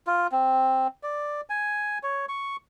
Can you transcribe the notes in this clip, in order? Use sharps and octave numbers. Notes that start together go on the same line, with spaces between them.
F4
C4
D5
G#5
C#5
C#6